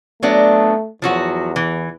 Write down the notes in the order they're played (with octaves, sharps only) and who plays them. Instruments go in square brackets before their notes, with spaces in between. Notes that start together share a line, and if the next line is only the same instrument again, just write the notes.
[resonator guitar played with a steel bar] F#3 B3 D4 [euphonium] A3
[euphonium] E2 [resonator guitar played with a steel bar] F3 F#3 F#4
[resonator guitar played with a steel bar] E3